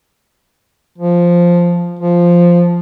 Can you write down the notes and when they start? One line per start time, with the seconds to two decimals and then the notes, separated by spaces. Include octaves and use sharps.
0.98 F3
1.99 F3